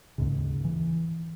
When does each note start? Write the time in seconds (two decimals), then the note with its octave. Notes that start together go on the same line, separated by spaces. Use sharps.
0.18 D#2 G#2 C#3
0.64 E3